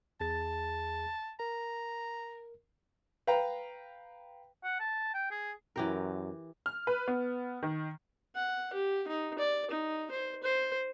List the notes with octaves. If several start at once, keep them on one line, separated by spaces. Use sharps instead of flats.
E2 G#4 A5 A6
A#4 A#5
B4 F5 G5 A#5
F#5
A5
G5
G#4
F#2 E3 G4 A#4
F6
B4
B3
D#3
F#5
G4
D#4
D5
D#4
C5
C5